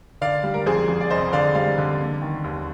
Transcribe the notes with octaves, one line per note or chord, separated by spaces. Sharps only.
D3 D5 F5
G3
A#4
F2 G#4 C5
F2
D5
F1 C5 D#5
D3 D5 F5
G3 D5 F5
D3
A#3
D#3
D#2